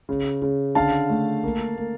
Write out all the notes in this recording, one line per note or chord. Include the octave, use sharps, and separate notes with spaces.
C#3
C#3
D3 F5 A5
A3
A#3
A#3